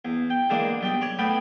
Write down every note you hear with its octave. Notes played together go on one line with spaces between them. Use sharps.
E2
G5
D3 E3 G#3 A#3 D4
B1 G3 G5
C#5 D5 C#6 D6
A2 A3 B3 G5 B5